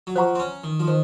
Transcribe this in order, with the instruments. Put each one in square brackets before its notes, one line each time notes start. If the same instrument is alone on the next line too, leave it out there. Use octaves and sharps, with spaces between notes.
[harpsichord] F#3
[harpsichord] F3 [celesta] C5 F#5 A#5 C#6
[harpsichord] C4
C#4
D#3
F3
[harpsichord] D#3 [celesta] C5